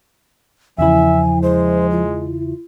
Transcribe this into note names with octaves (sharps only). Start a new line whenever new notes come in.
E2 C#3 F3 E4 E5 G#5
G#3 C5
F4